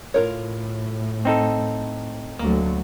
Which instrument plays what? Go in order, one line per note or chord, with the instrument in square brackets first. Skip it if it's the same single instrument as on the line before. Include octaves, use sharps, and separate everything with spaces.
[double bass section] A2 [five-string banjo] F4 A#4 C#5
[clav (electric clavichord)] C4 D#4 A4
[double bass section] D2 F#3 A3 [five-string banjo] A#3